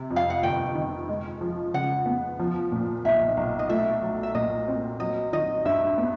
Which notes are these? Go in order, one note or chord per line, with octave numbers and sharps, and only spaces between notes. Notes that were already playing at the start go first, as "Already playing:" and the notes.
Already playing: C3
F2
F5
F#5
G1 G5
D#3
G#3
F3
C#3 F#5
B3
F3
A#2
B1 E5
B1
D#5
A3 E5
F#3
E5
A#2 D#5
C4
F#3 D#5
D#3 D#5
G2 E5
B3